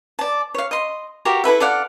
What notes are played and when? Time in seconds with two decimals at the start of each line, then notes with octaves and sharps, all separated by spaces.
0.19 D5 A5
0.54 C#5 F5
0.71 D#5 C6
1.25 F#4 G4 A#4 F5
1.44 E4 A4 B4 E5
1.60 A4 D5 F5 F#5